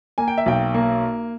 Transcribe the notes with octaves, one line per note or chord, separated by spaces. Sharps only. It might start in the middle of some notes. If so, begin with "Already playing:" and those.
A#3 G#5
G5
E5
B1 G5
A#3